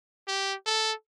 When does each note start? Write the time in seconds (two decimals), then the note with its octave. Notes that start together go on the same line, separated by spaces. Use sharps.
0.27 G4
0.66 A4